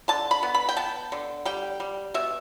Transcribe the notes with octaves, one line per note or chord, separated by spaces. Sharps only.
D3 A5
B5
B3
B5
G5
B3 A5
D3
G3 G5
G3
B2 E5